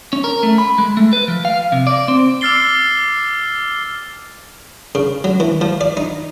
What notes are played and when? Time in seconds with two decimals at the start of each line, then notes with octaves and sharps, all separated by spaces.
0.13 C#4
0.24 A#4
0.43 A3
0.58 B5
0.78 G#3
0.97 A3
1.13 B4
1.28 F3
1.45 F5
1.72 C3
1.87 D5
2.08 C4
2.41 D6 E6 F6 A6 C7 G7
4.95 C#3
5.24 F#3
5.40 E3
5.61 F3
5.81 D5
5.97 D#4